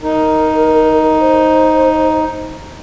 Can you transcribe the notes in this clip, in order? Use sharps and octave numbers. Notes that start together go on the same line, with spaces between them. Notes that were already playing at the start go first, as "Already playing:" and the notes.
D#4 A#4
C5